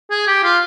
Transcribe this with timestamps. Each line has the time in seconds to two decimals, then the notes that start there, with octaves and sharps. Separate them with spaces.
0.10 G#4
0.27 G4
0.44 F4